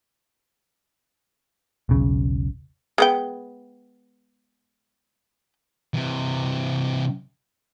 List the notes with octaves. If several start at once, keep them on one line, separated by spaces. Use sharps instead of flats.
E1 B1 C#3
G#3 B3 G5
C3 E3